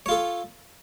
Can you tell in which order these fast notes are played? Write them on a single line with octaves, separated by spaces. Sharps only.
C#5 F4 A4